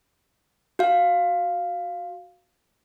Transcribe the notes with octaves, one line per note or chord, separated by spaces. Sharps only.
F#4 F5